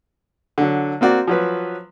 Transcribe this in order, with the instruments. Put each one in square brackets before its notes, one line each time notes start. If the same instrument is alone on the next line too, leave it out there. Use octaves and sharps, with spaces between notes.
[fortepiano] D3 F#3
A#3 C4 F#4 D5
F3 F#3 B4